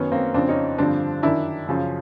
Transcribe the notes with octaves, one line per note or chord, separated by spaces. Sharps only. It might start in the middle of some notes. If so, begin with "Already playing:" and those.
Already playing: F#2 D#3 B3 C#4
A#3 C4
F2 C#3 F3 C4 D4
C#4 D#4
G2 D3 F3 C4 D4
F#2 D#3 D4 E4
F#2 C#3 F3